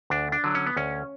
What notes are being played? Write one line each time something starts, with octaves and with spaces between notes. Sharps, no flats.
D2 D4
D4
D3 F#3
C#4
B3
D2 C#4